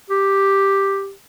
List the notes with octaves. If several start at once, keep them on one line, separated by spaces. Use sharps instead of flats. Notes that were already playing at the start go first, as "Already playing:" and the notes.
G4